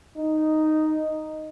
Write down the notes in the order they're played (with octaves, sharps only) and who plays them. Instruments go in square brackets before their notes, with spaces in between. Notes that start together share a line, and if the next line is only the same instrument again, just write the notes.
[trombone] D#4